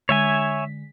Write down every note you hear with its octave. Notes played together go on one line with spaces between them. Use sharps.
D3 G#3 C#5 E5 G#5 B6